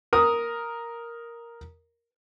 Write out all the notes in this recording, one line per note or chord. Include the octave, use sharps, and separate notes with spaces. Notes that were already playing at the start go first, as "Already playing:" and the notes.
A#4 D#6